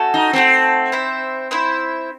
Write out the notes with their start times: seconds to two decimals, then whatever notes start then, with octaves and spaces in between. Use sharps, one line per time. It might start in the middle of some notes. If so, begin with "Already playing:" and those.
Already playing: A3 C#4 F#4 A4
0.14 D#4
0.33 A3 C4 C#4 F#4 A4
0.92 E4 C5 E5
1.51 E4 C5 E5